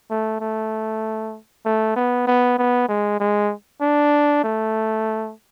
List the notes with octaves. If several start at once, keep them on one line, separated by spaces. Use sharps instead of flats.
A3
A3
A3
B3
B3
B3
G#3
G#3
D4
A3